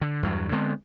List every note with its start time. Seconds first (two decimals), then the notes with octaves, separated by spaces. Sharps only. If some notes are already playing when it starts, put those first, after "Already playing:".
0.01 D3
0.23 E2 G2 F#3
0.52 D3 G#3 B3 C4